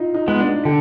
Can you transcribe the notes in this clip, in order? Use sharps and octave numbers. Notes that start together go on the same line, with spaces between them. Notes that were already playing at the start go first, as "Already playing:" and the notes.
Already playing: D#4 F4
D#4
G#3 B3
D4
D3 G4